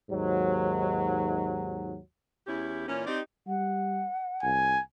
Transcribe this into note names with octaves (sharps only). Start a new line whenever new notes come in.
D#2 G#2 F#3
E2 C#4 E4 G4
A#2 E3 C#4
C4 D#4 G4 D5
G3 F#5
C2 G#5